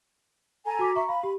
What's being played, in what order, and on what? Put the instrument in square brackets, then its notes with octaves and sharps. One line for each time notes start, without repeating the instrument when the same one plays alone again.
[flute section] A4 G#5 A#5
[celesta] F#4 D6 B6
[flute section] E5 [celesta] A#5 C#6
[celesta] F5 [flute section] B5
[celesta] G4